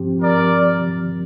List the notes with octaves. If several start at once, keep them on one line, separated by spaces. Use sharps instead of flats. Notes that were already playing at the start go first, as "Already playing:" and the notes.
Already playing: G2 F3 C4 G4
A#4 D5